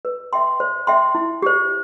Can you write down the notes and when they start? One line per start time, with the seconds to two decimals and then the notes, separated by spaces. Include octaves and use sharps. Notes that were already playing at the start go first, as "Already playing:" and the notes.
0.05 B4
0.33 E5 G5 C6
0.60 C5
0.87 E5 G5 C6
1.15 E4
1.42 G4 C5